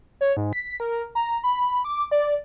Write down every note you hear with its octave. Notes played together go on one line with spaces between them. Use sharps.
C#5
G#2
B6
A#4
A#5
B5
D6
D5